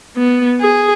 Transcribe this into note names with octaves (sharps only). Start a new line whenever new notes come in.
B3
G#4